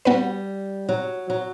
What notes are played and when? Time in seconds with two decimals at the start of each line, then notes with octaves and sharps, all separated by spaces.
0.05 G3 B3 F#4 B4
0.89 F#3
1.30 F#3